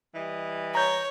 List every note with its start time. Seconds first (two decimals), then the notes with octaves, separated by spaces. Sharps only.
0.14 E3 G3 D#5
0.75 C#5 A#5 G6